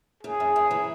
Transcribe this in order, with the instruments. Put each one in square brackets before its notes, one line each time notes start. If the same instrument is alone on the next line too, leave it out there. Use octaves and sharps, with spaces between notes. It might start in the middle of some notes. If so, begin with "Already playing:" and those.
[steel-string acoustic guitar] F#2 [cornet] G#4
[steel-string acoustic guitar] F#2
F#2
E3